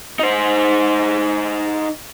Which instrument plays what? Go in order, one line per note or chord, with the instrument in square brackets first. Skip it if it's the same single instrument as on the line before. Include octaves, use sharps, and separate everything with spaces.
[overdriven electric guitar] D#4 C5